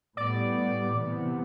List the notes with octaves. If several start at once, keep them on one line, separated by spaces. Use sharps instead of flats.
A2 G3 B3 D5
C3 E3 B3